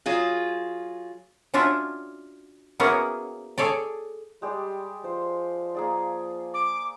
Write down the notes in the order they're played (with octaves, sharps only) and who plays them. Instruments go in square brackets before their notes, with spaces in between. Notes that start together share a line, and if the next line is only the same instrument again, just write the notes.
[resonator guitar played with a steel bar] F#3 F4 G#4
[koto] C#4 D4 F4 F#4 E5
A#3 B3 C#4 E4 F#4 G#4
G#4 A4 C#5 D5
[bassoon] G3 [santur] G#3 G4 D5
[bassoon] F3 [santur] C5
[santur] A#3 G#4 D5
[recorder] D6